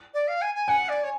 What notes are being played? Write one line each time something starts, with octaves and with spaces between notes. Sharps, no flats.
D5
F5
G#5
G#5
F#5 G#5
D5
C#5